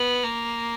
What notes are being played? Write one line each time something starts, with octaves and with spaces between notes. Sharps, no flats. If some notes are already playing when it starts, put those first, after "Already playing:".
Already playing: B3
A#3